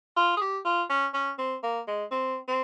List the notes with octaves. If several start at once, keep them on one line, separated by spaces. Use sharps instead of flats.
F4
G#4
G4
F4
C#4
C#4
C4
A#3
G#3
C4
C4